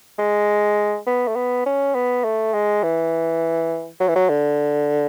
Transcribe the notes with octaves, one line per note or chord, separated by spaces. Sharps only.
G#3
B3
A3
B3
C#4
B3
A3
G#3
E3
F#3
E3
F#3
D3